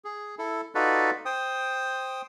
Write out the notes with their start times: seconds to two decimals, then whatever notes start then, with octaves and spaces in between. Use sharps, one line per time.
0.05 G#4
0.39 E4 A4
0.75 D#4 F4 F#4 A4 B4 D5
1.25 C5 G5 D#6